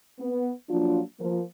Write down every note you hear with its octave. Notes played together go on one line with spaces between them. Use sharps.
B3
F3 F#3 A#3 D4 F4
F3 A#3